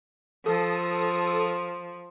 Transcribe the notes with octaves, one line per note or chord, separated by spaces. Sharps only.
F3 A4 D#6